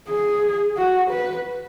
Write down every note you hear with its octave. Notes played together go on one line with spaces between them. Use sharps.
G#4
F#4
B4